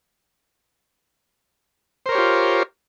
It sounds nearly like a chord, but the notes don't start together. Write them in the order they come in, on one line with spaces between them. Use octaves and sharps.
C5 A#4 C#5 G4 F4